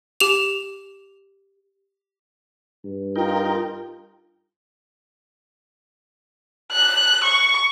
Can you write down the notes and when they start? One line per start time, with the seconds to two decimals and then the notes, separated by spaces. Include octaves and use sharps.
0.20 G4 F7
2.85 G2
3.16 D#4 F4 A#4 G5
6.72 F#6
7.23 C#6